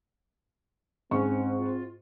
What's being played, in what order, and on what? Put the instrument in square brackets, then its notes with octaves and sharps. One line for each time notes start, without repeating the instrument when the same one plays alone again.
[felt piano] G#2 C#6 [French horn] C4 [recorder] C#4
[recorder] F4